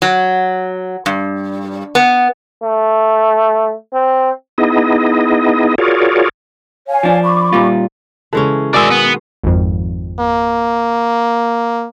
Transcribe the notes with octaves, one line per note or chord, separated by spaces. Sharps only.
F#3
G2
B3
A3
C4
B3 D#4 E4 G#4 D#5
F4 F#4 G#4 A#4 C#5 D5
C#5 F5 G#5
F3 D4
B5 C#6 D6
A#2 G3 F4
C#3 E3 G#3 C#4 A4
B2 D#3 G#3 D5 E5 G#5 D#6 E6
B3
G#1 F2
A#3